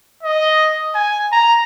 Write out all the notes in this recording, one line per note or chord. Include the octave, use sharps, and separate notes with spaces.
D#5
G#5
A#5